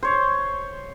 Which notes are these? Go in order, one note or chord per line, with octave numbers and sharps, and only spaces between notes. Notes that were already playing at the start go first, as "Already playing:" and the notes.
C5 C#5